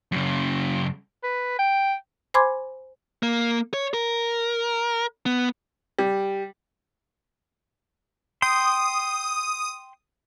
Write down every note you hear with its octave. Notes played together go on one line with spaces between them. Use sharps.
F#2 C#3
B4
G5
C5 G#5 B5 C6 D6 G#6
A#3
C#5
A#4
B3
G3
G5 C6 D#6